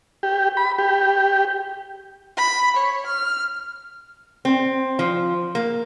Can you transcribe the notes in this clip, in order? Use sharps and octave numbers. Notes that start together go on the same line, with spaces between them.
G4
B5
G4
B5
C#5
F6
C4
F3
A#3